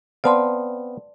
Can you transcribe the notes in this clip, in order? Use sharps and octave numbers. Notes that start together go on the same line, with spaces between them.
B3 C4 D5 F5 A5 C6